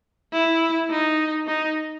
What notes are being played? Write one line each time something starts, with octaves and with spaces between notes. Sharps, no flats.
E4
D#4
D#4